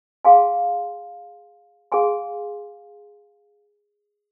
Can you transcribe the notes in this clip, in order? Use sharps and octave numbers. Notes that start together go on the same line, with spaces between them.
G#4 F5 G#5 C6
G#4 F5 G#5 C6